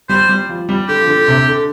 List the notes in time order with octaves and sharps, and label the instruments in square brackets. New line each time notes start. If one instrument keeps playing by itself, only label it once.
[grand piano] G3 [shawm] C5
[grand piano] G3
F3
G3
[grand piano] D3 [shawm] G4
[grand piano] F3
D3
D3
C3
D3